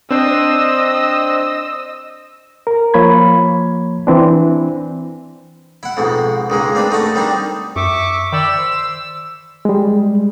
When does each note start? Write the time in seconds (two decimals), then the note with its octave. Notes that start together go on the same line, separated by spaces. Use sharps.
0.10 C4 D4 C5 D#5 E6
2.67 A#4
2.94 F3 A#3 C#5 B5 G#6
4.07 E3 C4 D4
5.83 E4 F#5
5.97 F2 G#2 B2
6.50 C#2 D#3 G#3 A#3
6.75 A#3 C4 D4 B4
6.90 A3 D#4 F#4 A5
7.15 D#3 G3 C4 D4 D#4
7.76 F#2 E5 C#6 D6
8.32 D#3 D5 G5 B5 E6
8.57 C5
9.65 G3 G#3